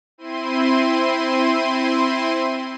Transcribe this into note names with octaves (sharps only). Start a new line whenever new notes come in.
C4 E4 C6 D#7